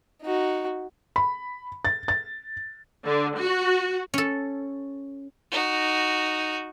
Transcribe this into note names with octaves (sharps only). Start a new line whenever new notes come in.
D#4 F#4
B5
A6
A6
D3
F#4
C#4 A4
D#4 F#4